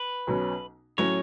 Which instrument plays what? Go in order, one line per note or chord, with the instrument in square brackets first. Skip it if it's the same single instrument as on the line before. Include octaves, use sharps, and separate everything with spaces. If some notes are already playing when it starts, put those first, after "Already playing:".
Already playing: [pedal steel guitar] B4
[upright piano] B1 B2 F#3 C#4
[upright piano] A2 F#3 C#4 [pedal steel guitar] C#5